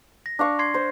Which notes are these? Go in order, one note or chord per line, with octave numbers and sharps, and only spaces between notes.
A#6
D4 F5 C#6
C6 G#6 C7
C5